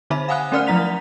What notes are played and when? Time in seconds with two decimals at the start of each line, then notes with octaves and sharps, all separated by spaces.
0.10 D3 D#4 C5 E5 B5
0.28 F5 F#5 G#5 D#6 F#6
0.52 A3 C#4 A#4 D5 F#5 F6
0.67 F3 F#3 E4 A#5 B6 F7